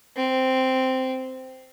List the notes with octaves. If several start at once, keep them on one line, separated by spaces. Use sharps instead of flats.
C4